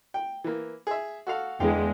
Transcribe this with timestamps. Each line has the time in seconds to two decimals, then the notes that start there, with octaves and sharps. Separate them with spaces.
0.14 G5
0.44 E3 A#3
0.87 G#4 E5
1.27 F#4 A4 F5
1.60 E2 D3 G#3 F5 G5